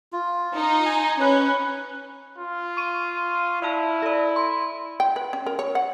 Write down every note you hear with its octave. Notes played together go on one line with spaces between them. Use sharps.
F4
D#4
G#5
C#4 B4
F4
C#6 D#7
E4 D5 E5 A5
A4 D5
C6
G5
B4
C#4
A#4
C#5
F#5